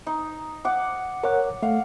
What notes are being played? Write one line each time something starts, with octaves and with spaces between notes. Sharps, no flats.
D#4
F#5 D6
A#4 C#5 F#5 D6
A3 F5 F#5